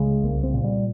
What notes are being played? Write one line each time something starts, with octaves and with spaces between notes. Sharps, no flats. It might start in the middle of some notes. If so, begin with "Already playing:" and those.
Already playing: C#2 C#3 G#3
C2 A#3
C4
A#2
G3